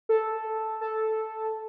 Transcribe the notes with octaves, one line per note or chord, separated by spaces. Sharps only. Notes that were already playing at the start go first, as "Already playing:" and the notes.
A4
A4